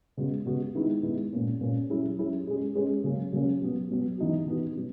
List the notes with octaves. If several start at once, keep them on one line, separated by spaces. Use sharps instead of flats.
C#3 G#3 B3 F#4
C#3 G#3 B3 F#4
D#3 G#3 B3 E4
D#3 G#3 B3 E4
A#2 A#3 C#4
A#2 A#3 C#4
F#3 C#4 E4 G#4
F#3 C#4 E4 G#4
G#3 C#4 G#4
G#3 C#4 G#4
C#3 F#3 A#3 C#4
C#3 F#3 A#3 C#4
B2 F#3 B3
B2 F#3 B3
E3 B3 D#4 F#4
E3 B3 D#4 F#4
B2 F#3